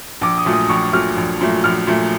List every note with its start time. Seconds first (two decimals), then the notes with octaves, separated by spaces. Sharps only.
0.21 A#1 D6
0.38 D#6
0.45 A#2 F#3 A3
0.53 D#6
0.69 A#1 C#6
0.92 A#2 F#3 A3 F6
1.16 A#1
1.41 A#2 F#3 A3
1.64 A#1 F6
1.87 A#2 F#3 A3